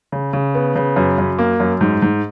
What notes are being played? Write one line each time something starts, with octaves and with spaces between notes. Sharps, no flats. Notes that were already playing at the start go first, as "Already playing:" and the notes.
C#3
C#3
B3
C#3
F#2
F#2
A#3
F#2
G#2
G#2